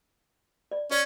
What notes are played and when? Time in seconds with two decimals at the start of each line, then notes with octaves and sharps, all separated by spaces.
0.71 D5
0.91 C#4 D5